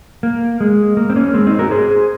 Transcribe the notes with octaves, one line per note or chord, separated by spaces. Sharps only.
A#3
G#3
A#3
C4
A#3 C#4
G#3 C4
C4 D#4
F#4 A#4
G#4 C5